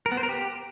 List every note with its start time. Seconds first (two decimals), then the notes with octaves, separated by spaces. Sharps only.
0.06 A#4
0.12 B3
0.17 C5
0.23 A#4
0.29 G4